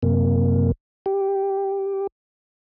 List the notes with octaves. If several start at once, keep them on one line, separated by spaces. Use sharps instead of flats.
F#2 C3 A#3
G4